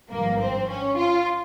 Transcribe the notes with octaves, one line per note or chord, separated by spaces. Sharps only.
G#1 G2 F3 A#3
C4
C#4
F4